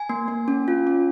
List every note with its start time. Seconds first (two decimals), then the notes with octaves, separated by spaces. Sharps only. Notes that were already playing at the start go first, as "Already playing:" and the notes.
Already playing: G#5
0.09 A#3
0.28 A#3
0.48 C#4
0.68 F4
0.87 C#4